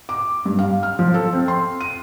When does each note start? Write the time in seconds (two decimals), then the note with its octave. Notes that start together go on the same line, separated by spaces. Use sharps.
0.09 D6
0.46 G2
0.59 F5
0.83 F6
0.99 F3
1.14 A4
1.33 C4
1.48 C6
1.81 D#7